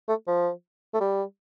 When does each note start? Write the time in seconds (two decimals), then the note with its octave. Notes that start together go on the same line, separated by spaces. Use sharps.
0.09 A3
0.27 F3
0.94 A3
1.01 G3